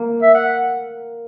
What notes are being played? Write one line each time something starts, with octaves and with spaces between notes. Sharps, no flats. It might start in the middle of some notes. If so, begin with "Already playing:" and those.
Already playing: A#3
E5
F#5